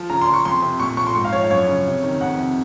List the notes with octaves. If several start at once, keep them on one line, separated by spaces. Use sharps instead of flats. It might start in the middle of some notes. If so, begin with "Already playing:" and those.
Already playing: F3
C#3 A#5
C6
F3
C#6
F2 C6
C3
A#2 C#6
F3 C#6
C6
G#2 C#6
F5
F3 C#5
F5
F#2 C#5
C#3
C3
D#3
F2 F#5
C3